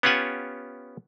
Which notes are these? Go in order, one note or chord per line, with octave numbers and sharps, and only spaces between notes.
B3 C#4 F4 G4 F#5 G#5